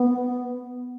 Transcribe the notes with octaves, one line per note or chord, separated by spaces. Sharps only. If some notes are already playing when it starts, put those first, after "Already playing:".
Already playing: B3